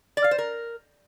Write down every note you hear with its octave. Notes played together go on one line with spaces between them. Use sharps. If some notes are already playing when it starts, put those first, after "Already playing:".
D5
F5
C5
A#4